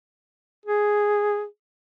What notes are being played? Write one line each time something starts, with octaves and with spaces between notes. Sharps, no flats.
G#4